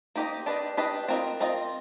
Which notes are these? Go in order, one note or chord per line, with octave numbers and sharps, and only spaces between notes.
A#3 D#4 G4 C5 D#5
D4 G4 B4 D#5
D4 G4 B4 D#5
C4 F4 A#4 D#5
C4 F4 A#4 D#5